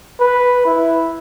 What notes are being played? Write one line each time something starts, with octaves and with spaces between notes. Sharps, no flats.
B4
E4